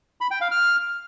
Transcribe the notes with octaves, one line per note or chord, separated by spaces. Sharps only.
B5
G5
F5
F6